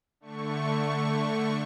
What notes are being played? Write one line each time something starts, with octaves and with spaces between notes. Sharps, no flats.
D3 A3 C#6